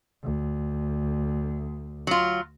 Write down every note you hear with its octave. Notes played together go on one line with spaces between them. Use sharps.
D2
F#3 F4